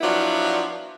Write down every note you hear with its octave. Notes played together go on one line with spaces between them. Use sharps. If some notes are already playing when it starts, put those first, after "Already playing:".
F3 F#3 B3 D4 E4 F4